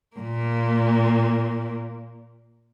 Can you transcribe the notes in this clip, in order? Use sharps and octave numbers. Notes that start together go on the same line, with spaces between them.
A#2 A#3